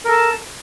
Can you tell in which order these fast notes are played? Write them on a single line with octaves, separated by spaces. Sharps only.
A#4 A4 A5